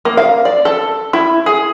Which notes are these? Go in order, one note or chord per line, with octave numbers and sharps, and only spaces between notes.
A#3
F5
D5
A4
E4
G#4